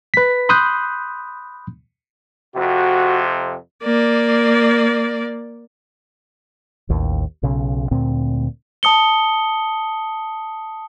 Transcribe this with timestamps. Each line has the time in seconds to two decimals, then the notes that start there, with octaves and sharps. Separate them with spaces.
0.14 B4 B6
0.49 B5 C6 D#6 F#6 G6
2.56 F2 C3 F#4
3.84 A#3 D5
6.89 A1 D#2
7.43 B1 C#3
7.91 D2 A#2 C4
8.83 A5 D#6 C#7 G7